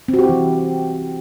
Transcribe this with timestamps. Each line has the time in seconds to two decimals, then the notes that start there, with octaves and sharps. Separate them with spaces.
0.08 C4
0.14 F#4
0.19 G4
0.24 E4
0.29 E3